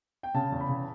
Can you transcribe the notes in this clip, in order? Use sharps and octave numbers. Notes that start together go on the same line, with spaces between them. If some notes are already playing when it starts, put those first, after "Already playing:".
G5
C#3 A5
E2
B5
C#3